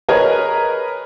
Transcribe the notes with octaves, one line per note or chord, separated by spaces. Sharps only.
G#4 A#4 B4 C#5 D#5